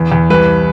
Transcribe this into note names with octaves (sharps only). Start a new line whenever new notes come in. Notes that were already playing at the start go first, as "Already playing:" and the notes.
Already playing: E2
E2
C2 B4